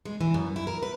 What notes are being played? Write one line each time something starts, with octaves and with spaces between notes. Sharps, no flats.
G#3
E3
F#2
E4
A#4
B4